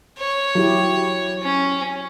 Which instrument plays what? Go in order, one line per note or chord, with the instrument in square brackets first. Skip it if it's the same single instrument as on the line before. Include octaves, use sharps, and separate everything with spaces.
[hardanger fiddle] C#5
[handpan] F#3 E4 G4
[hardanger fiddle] C#4